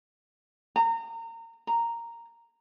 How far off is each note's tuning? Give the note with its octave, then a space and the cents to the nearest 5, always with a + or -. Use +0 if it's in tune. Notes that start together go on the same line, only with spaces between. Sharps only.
A#5 -30
A#5 -5